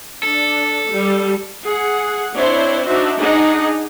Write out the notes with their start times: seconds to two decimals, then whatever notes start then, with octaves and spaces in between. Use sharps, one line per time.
0.23 D4 A4
0.91 G3
1.64 G#4 F#5
2.34 C4 D4 E4 C5 C#5
2.86 D4 D#4 F#4 C5 E5
3.20 D4 D#4 G#4 F#5